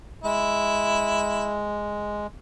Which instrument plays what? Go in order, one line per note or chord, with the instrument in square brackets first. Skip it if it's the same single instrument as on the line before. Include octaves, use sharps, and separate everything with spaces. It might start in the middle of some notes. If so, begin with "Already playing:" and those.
[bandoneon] G#3 [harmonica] E4